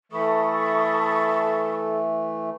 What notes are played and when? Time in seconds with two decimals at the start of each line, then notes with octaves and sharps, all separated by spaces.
0.12 E3 A3 A4 B5 C#6 D#6